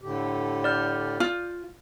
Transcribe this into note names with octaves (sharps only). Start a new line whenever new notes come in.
A2 D3 G4
D5 F6 G6
F4